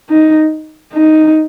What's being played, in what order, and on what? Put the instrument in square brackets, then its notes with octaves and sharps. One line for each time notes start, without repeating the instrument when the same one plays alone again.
[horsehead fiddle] D#4
D#4